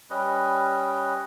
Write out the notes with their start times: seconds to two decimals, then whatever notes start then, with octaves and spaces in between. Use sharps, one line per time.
0.10 G3 C#4 B4 D#5